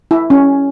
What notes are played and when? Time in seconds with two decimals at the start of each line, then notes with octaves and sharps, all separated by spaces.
0.11 E4
0.30 C#4